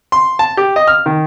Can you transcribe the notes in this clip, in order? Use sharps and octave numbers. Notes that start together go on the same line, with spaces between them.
C6
A5
G4
D#5
F6
D#3